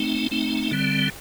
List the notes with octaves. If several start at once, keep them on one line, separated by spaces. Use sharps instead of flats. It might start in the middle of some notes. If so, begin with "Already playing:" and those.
Already playing: A3 C4 D#4
A3 C4 D#4
D3 G3 C4